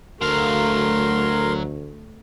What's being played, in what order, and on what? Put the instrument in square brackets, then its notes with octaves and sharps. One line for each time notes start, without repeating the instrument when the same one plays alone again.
[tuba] D2 [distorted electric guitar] F#3 F5 [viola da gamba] A3 [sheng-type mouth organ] A#4 C6